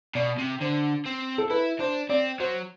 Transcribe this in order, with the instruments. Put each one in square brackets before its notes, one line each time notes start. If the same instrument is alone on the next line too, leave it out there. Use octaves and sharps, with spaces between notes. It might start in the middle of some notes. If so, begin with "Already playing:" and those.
[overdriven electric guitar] B2 [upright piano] D5
[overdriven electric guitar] C3
[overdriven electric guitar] D3 [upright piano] C5
[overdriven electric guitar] C4
[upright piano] A4
[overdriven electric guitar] E4 [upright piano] B4
[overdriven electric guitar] D4 [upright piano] C5
[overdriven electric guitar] C4 [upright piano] D5
[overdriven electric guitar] F#3 [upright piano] C5